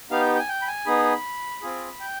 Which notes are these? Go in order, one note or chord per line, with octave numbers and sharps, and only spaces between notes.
B3 D#4 G4 F5
G5
G5
G#5
G5
B5
G#5
B3 D#4 G#4 B5
C4 F4 G#4
G5